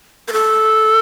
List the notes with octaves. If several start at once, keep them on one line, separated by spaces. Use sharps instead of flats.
A#4
A4